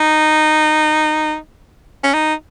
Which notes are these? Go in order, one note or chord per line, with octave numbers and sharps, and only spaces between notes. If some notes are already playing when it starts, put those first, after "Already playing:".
Already playing: D#4
C#4
D#4